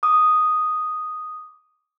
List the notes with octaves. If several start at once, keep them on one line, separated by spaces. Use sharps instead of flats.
D6 D#6